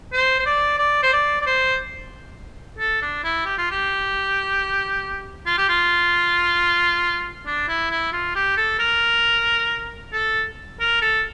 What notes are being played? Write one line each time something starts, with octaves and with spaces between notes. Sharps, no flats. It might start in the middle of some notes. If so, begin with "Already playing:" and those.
C5
C5
D5
D5
C5
D5
D5
C5
A4
D4
E4
G4
F4
G4
F4
G4
F4
D4
E4
E4
F4
G4
A4
A#4
A4
A#4
A4